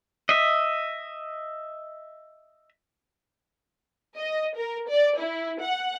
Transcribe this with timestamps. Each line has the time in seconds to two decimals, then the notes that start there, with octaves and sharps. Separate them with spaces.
0.29 D#5 E5
4.18 D#5
4.56 A#4
4.89 D5
5.19 E4
5.61 F#5